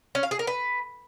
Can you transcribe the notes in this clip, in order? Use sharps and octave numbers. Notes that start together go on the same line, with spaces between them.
C#4
F5
G#4
A#4
B4